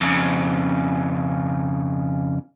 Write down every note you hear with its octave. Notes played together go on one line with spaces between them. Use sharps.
F2 C#3